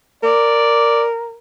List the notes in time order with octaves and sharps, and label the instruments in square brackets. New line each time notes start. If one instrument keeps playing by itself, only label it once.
[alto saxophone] A#4 [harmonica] D5